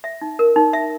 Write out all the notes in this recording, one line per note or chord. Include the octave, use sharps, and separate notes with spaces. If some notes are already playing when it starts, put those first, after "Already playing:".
E5
D#4
A#4
D#4
E5